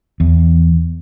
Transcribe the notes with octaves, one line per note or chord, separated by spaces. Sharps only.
E2